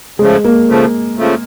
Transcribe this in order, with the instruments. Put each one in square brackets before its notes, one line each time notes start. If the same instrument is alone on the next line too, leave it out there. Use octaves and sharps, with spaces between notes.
[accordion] C#3 F3 A3 [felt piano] G#3
[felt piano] A#3
[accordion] C#3 F3 A3
C#3 F3 A3